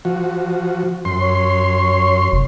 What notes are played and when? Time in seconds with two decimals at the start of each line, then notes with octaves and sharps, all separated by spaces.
0.05 F3 F#4
1.05 F#2 C6
1.21 C#5
2.32 F1